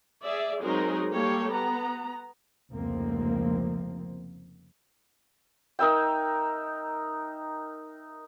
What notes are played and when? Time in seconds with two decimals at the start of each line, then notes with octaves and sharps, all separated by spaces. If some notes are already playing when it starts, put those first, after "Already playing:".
0.22 G#4 D5 E5
0.62 F#3 G#3 C4 D#4 G#4 A#4
1.11 G3 A#3 G4 A4 C#5
1.53 B3 A#5
2.71 F1 C#2 F3 A#3 C4
5.79 D#4 A#4 E5 G5